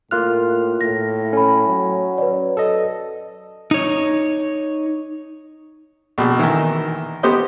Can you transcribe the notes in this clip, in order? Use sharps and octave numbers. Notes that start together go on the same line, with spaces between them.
A2 A#3 F4 F6 F#6
A2 A#6
C#4 A4 B5
F#3
B4 C#5 D5
A4 D#5
D#4 C#5
A#1 B2
D#3 E3
B3 G4 C5 D#5